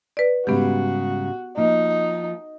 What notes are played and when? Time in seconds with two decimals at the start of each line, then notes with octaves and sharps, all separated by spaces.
0.17 B4 D5
0.47 G#2 C#3 G3 B3 F#4 G4
1.57 F3 A#3 D#4